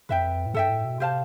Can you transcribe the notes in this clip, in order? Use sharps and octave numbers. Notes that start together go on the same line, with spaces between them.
F2 B4 E5 G5
A2
G2 A4 E5 G5
A2
B2
C3 G4 C5 F5 A5